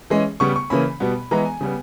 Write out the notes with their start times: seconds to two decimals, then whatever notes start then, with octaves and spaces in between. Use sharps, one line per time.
0.10 E3 G#3 C#4
0.40 C#3 G3 B3 C#6
0.56 C#6
0.70 C#3 E3 A#3 C#4 B5
1.00 B2 G3 B3
1.31 E3 G#3 B3 A#5
1.45 G#5
1.61 C#3 G3 B3